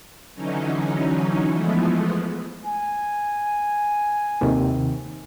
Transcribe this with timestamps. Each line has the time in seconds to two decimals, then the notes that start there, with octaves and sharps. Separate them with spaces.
0.34 D3 E3 F#3 C#4 D#4
1.48 E3 F3 G#3 A3 B3
2.66 G#5
4.41 D#2 C3 D#3